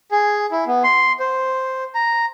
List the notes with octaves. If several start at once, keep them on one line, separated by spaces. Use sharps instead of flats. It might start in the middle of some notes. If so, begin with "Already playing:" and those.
G#4
E4
B3
C6
C5
A#5